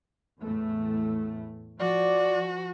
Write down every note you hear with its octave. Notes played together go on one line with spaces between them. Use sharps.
E2 A2 A3
F3 F#4 D5